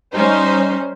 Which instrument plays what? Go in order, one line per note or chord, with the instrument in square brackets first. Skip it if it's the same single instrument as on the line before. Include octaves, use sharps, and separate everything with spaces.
[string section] G3 C#4 D#4 C5